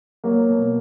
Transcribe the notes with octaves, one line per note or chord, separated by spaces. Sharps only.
F#3 A#3
B2